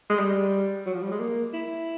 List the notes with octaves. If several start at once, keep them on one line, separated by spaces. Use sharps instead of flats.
G#3
G3
F#3
F3
G3
G#3
A#3
E4